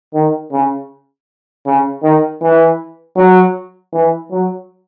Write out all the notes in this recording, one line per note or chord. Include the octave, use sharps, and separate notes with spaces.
D#3
C#3
C#3
D#3
E3
F#3
E3
F#3